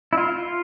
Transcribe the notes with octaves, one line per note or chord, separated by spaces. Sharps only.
E4
F4